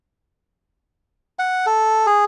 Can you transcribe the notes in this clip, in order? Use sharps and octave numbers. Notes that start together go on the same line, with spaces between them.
F#5
A4
G#4